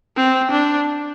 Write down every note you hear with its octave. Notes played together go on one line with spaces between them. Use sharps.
C4
D4